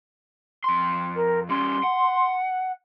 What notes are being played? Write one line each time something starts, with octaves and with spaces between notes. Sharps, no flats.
F2 C6
A#4
G3 C#4 C6
F#5